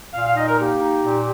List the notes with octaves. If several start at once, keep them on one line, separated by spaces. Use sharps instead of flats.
A#2 F5
F5
D#4 D#5
A#4
A#3 G4
D#4
A#2